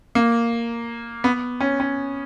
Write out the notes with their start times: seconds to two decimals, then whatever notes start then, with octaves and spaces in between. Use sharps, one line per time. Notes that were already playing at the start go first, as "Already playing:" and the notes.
0.15 A#3
1.24 B3
1.61 C#4
1.80 C#4